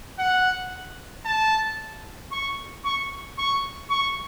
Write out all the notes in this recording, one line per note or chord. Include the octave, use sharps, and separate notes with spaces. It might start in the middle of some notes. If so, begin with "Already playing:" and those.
F#5
A5
C#6
C#6
C#6
C#6